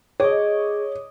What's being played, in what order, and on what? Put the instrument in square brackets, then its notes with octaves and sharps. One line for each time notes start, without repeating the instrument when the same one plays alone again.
[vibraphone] G#4 [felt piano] C#5 [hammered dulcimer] D#5 D6